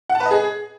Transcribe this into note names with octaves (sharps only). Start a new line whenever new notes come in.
F#5
A5
B4
D#5
G#4